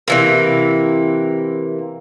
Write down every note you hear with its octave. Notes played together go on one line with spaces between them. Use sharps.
C3 E3 A#3